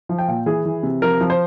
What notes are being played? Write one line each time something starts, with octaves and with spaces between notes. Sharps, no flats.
F3
G5
A#2
E3 G#4
E3
C3
F3 A#4
F3
C5